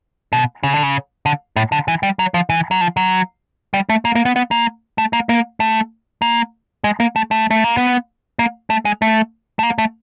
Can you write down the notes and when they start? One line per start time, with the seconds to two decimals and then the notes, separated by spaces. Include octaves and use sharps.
0.33 B2
0.63 C#3
0.73 D3
0.83 C#3
1.26 D3
1.56 A2
1.72 D3
1.88 E3
2.03 G3
2.19 F#3
2.34 F3
2.50 E3
2.71 F#3
2.81 F3
2.97 F#3
3.74 G3
3.89 A3
4.05 A#3
4.15 A#3
4.25 B3
4.36 B3
4.51 A#3
4.98 A3
5.13 A#3
5.29 A#3
5.60 A3
6.22 A#3
6.84 G#3
7.00 A#3
7.16 A3
7.31 A3
7.51 A3
7.64 A#3
7.77 B3
8.39 A#3
8.70 A3
8.85 G#3
9.02 A3
9.59 A3
9.63 A#3
9.78 A3